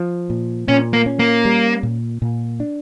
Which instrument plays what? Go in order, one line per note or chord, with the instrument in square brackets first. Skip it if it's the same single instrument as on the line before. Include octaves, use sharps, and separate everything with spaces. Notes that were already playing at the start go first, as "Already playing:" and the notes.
Already playing: [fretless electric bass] F3
A#2
[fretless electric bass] A#2 [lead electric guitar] C#4
[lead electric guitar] A#3
[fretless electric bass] C#4
[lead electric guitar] A#3
[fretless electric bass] G3
A#2
A#2
D4